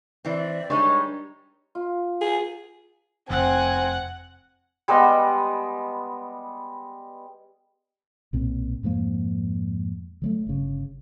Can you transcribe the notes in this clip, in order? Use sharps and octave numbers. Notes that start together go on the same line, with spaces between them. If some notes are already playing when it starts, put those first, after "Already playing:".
E3 C4 D5 E5
G3 G#3 D4 D#4 C#5
F4
G#4
F1 C4 F#5 G#5
G3 G#3 B3 D#5
B1 A#2 C4
F2 G#2 F3 A#3
D3 F#3 A3
G1 C#3